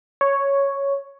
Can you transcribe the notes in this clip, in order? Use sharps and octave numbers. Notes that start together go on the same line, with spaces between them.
C#5